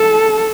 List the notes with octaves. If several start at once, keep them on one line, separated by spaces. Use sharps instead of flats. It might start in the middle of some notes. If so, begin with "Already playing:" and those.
Already playing: A4